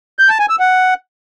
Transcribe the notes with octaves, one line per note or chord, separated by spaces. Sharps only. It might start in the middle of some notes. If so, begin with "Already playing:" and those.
G6
A5
G#5
E6
F#5